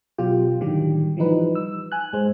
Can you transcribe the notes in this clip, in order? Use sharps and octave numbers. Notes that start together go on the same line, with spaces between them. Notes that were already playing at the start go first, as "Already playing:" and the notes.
B2 F#3 F4 G4 G5
A2 D3 D#3 F#3 G3 G4
E3 F3 G3 D#4 B4
E6
G#5 F#6
G#2 G#3 C5